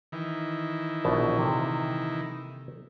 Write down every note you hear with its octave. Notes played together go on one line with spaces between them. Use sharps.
D#3 E3
A#1 B2 A5
C3 A#3 A4